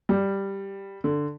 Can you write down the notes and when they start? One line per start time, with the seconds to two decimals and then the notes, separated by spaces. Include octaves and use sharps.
0.09 G3
1.04 D3